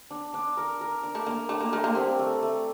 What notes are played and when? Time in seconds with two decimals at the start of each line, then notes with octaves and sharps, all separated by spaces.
0.11 D4
0.34 D4
0.57 A#4
0.81 A#4
1.03 D4
1.15 A3
1.26 A#3 D4
1.49 A3 D4
1.61 A#3
1.72 A3 A#4
1.84 A#3
1.95 G3 C4
2.19 A3
2.42 A3